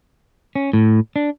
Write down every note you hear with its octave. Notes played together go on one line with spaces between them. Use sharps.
C#4
A2
D4